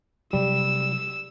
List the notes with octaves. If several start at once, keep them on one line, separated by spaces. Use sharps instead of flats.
C3 F#3 G3 E6